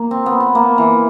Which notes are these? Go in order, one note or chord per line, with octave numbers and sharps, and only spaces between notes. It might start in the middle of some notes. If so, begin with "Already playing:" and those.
Already playing: A#3
C4
B3
B3
A#3
E3